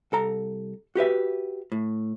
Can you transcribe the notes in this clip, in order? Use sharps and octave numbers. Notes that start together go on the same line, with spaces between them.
C2 A4 A#5
F#4 G4 B4 E5
A2